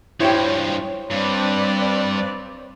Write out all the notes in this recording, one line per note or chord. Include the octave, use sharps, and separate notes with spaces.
G2 F3 E4 G4 C5 C#5 G5
G2 C4 B4 D5